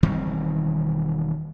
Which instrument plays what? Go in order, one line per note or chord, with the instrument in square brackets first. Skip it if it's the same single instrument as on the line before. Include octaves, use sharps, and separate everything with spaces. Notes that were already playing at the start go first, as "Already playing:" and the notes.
[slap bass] E1 D#3 G3 C4